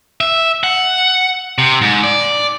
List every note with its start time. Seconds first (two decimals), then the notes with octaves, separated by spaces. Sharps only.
0.21 E5
0.64 F#5
1.58 C3
1.82 G#2
2.04 D5